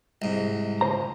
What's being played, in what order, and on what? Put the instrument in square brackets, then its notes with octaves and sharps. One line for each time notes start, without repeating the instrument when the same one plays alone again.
[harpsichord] C2 G#2
[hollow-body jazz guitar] C#2 C5 A#5